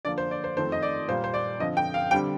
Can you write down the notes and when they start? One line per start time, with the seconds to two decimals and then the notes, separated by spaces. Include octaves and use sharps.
0.05 D3 F3 A#3 D5
0.18 C5
0.31 D5
0.44 C5
0.57 F2 D#3 A3 C4 C5
0.72 D#5
0.82 D5
1.08 A#2 G3 A#3 C5
1.24 C5
1.34 D5
1.60 D3 F3 C4 D#5
1.77 G5
1.94 F5
2.11 D3 G3 C4 G5